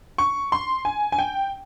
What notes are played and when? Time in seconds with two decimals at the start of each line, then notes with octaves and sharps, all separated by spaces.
0.18 C#6
0.52 C6
0.85 G#5
1.12 G#5
1.18 G5